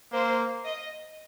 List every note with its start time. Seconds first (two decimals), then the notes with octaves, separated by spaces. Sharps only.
0.12 A#3 C5
0.65 D#5